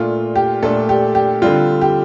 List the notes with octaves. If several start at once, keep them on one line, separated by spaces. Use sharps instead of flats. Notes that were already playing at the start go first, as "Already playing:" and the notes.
Already playing: A#2 A3 D4 F4
G4
A#2 A3 D4 A4
G4
G4
D3 G3 C4 F4
G4